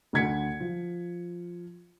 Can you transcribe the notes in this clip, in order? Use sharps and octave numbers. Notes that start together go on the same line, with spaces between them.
D2 D3 F#5 G#6 B6 C#7
F3